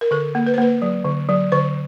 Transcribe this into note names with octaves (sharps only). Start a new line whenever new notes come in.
A#4
D3 A4
A#3
B4
C5
A#3 B4
F#3
D3
F#3
D3 C5